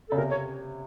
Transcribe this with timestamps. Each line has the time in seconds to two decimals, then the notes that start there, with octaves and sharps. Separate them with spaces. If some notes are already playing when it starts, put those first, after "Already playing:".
0.09 C#3 A4
0.18 C3 A#4
0.31 C#5